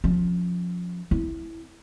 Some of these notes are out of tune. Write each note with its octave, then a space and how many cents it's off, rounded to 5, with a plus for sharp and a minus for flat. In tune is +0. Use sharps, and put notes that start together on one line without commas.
F3 +20 C#4 -5
C4 -40 E4 -5